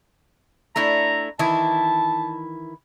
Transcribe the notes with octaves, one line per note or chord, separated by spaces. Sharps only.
A3 D4 E4 A#5
D#3 E3 E4 A5